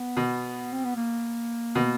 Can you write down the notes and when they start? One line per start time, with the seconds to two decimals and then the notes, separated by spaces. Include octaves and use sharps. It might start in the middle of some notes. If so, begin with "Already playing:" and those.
Already playing: B3
0.17 B2
0.73 C4
0.85 B3
0.96 A#3
1.75 B2